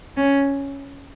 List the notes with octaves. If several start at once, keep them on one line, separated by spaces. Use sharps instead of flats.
C#4